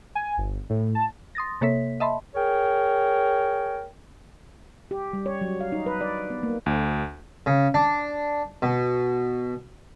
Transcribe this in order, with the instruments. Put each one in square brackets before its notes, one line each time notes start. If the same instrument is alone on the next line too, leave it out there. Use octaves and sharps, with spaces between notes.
[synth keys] G#5
G1
A2
A5
[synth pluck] C6 D#6 A6 A#6
C3 A#3 A4 C#5 E5 B6
D#5 E5 A5 B5 C6
[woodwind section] G#4 A#4 C#5 G5
[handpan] G4
G3
C#5
F#3
F5
D#4
B4
D5
B3
A#3
[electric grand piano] D2
[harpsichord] C#3
D4
B2